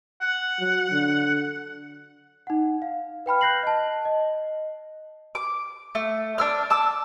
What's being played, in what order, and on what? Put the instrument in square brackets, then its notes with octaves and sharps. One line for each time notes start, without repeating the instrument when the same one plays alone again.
[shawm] F#5
[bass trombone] F#3
D3
[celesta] D#4 F#5
F5
B4 G5 B5 F6
F#6 G6 A#6 C7 F#7
D#5 A5
D#5
[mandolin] D6
A3
D4 E6 F6
A5 D6 E6